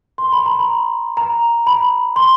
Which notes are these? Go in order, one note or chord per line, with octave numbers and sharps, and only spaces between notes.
C6
B5
A#5
B5
A#5
B5
C6